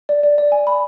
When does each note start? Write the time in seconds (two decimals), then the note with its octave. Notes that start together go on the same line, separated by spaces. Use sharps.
0.09 D5
0.23 D5
0.38 D5
0.52 G#5
0.67 B5